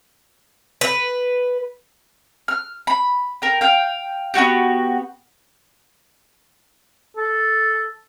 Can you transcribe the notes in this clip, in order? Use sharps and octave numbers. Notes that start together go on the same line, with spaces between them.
B4
F6
B5
A#4 G5
F5 G5
B3 C4 F#4 G4
A4